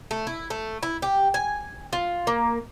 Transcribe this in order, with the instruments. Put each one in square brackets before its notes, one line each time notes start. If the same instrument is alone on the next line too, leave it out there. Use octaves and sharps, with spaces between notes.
[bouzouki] A3
E4
A3
E4
G4
G#5
F4
A#3